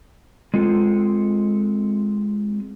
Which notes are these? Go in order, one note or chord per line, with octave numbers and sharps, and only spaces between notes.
G#3 C4 F4 A4